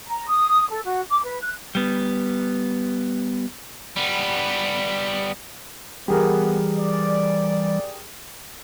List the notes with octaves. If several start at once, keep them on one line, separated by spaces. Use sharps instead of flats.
A#5
D#6
A4
F#4
D6
B4
F#6
G3 B3
G3 B3
E3 G3 B3 G4 G#4 A#4
D5